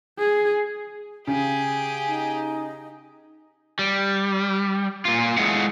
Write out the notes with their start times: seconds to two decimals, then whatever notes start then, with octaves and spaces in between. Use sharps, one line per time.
0.19 G#4
1.27 C#3 G4 G#4 G#5
2.07 D#4
3.79 G3
5.05 A#2 F4
5.37 G#3 A3 E4 G#4 F5 F#5